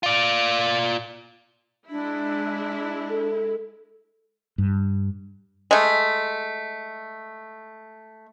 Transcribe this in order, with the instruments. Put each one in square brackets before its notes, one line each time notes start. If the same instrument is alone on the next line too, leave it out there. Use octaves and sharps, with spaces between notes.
[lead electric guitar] F4 D5
[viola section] G#3 E4 [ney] D4
[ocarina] A4
[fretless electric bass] G2
[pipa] G#3 A3